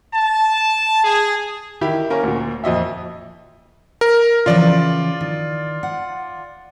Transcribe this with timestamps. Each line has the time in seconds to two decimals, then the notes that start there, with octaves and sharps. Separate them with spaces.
0.14 A5
1.04 G#4
1.81 D#3 E4 G4
2.10 A#3 C#4 A#4
2.23 D2 A#2
2.64 F2 A#2 D#5 E5
4.01 A#4
4.46 C#3 E3 F3 F4 D5
5.21 D#3
5.83 F#5